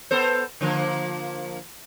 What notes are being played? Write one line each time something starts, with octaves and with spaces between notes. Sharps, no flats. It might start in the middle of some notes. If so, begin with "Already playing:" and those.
B3 A4 C5
D3 F3 A#3